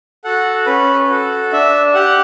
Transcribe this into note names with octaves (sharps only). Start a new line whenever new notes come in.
F#4 A4 F#5
C#4 B4
F#4 A4
D4 E5
G4 F#5